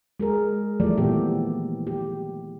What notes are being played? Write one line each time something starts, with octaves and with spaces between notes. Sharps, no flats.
G#3 G#4 A#4
E3 F3 G3 A3 D5
A#2 D#3 E3 B3 G4
G4